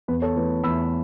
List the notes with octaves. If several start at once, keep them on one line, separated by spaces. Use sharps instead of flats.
E2 B4
A4 C#5
E3 A3 B4
E2 B5 E6